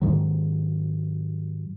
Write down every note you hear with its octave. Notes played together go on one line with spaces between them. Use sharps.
G#2 D#3 F#3